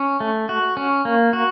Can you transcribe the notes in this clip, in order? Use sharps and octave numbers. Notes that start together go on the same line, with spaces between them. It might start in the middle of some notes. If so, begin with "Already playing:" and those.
Already playing: C#4
A3
F#4
C#4
A#3
F#4